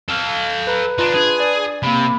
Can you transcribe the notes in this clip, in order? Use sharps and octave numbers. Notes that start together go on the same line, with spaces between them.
A4 F5
B4 A#5
D4 D#4 F4 B4
D4 G#4 B4
D5 G#6
C3 A#3 B5